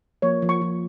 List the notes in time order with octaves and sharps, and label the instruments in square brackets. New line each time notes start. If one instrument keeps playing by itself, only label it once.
[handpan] F3 A#3 [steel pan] C#5
[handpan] F3
[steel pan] C#6
[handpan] F3